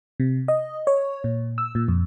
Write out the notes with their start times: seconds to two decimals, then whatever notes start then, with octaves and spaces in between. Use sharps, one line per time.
0.20 C3
0.48 D#5
0.87 C#5
1.24 A#2
1.58 E6
1.75 A#2
1.88 F2